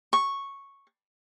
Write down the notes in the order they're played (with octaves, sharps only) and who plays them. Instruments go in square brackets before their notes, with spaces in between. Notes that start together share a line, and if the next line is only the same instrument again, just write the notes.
[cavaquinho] C#6